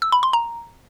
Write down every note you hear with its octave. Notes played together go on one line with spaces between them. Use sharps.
E6
B5
C6
A#5